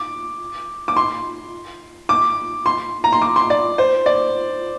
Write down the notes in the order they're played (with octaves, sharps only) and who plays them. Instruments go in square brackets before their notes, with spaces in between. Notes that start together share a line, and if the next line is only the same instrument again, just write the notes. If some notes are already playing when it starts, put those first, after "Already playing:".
Already playing: [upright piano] D6
D6
C6
D6
C6
A#5
C6
D6
C6
D5
C5
D5